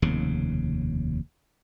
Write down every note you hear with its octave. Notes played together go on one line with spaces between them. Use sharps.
F1 D#2 C#3